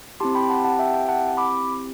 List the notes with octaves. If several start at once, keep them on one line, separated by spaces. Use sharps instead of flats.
C4 E4 G4 A5 C6
G5 B5
F#5 A5
F#5 A5
E5 G5
E5 G5
F#5 A5
B5 D6